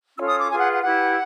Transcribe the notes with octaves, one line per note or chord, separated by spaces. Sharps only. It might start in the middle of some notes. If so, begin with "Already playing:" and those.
C#4 F4 A4 C#5 E6
D#6
D6
F4 G#4 B4 G#5
F#5
F#5
E4 G4 B4 F#5